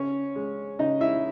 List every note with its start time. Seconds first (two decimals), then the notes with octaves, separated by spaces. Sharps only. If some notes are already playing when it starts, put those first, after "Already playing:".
Already playing: C#3 C#4 C#5
0.35 G#3
0.79 C#3 D#4 D#5
1.01 E4 E5